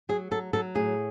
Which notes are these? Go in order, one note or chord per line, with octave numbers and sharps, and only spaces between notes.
F#3 G#4
F#3 A4
F#3 A4
A2 G#4